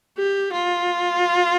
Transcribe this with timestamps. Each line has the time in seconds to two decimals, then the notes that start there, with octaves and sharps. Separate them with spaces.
0.18 G4
0.52 F4